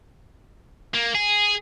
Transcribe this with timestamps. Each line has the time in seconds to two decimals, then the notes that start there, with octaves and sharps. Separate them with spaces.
0.94 A#3
1.15 G#4